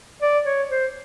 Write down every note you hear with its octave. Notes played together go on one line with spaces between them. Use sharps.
D5
C#5
C5